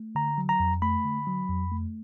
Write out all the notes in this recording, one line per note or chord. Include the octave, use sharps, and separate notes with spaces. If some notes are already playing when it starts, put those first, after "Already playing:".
Already playing: A3
D3 A#5
F#3
A#5
F2
A3 B5
D3
F#3
F2
A3